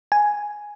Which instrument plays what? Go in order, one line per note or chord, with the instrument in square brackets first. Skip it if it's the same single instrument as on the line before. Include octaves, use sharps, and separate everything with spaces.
[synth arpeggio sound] G#5